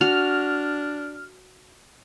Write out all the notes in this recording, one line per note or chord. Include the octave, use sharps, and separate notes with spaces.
D4 F#4 F6